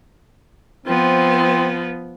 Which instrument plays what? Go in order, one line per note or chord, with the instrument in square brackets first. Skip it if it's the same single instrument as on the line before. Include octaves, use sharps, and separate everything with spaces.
[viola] F3 B3 [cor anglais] C4